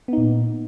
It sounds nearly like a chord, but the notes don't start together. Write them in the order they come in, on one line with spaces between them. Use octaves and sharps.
B3 D#4 A#2